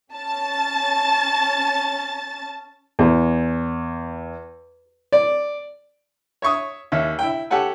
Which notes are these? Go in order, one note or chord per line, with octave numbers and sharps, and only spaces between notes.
C#4 A5 A6
E2
D5
C#5 E5 C#6 D#6
D#2 C#4 E5
E4 G5
G4 A4 C#5 F#5 G#5